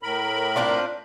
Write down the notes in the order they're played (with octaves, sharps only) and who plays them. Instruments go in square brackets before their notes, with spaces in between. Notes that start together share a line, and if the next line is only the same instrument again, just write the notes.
[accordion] A2 A#4 B5
[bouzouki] C4 D4 F4